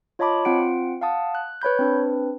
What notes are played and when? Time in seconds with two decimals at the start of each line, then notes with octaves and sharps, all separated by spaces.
0.19 F4 C#5 D#5 A5 B5 D6
0.45 C4 F4 F#5 D7
1.01 F5 F#5 A5 D#6
1.35 F#6
1.62 B4 C#5 B5 G6
1.79 C4 D4 B4